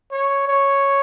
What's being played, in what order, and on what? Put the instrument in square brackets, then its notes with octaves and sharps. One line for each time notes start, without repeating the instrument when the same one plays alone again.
[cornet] C#5
C#5